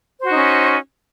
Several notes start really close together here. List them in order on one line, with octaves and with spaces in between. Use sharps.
C5 F#4 D#4 C#4